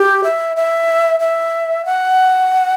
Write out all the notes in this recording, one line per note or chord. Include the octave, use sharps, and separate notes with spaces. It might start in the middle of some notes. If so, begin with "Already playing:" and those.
Already playing: G4
E5
E5
E5
F#5